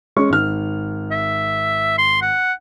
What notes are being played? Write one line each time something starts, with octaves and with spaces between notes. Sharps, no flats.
G#3 C#4 C#6
G#1 F6
E5
C6
F#5